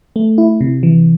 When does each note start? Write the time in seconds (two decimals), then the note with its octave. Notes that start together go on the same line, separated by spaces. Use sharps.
0.16 A3
0.38 E4
0.61 C3
0.83 E3